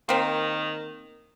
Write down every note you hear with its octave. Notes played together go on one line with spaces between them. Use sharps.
D#3 A#3 C4